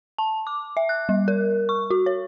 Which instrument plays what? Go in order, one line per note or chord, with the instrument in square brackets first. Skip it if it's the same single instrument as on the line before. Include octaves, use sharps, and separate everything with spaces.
[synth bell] A5
D6
E5
F#6
G3
A#4
C#6
F#4
C#5